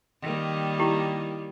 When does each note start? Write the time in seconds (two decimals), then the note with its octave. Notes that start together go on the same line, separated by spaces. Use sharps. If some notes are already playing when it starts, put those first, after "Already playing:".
0.22 D#3 G3 A#3
0.79 E4 G4